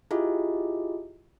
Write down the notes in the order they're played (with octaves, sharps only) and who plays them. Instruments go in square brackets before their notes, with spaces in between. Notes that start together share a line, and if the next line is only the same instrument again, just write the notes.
[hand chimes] E4 F4 G4 G#4 D#5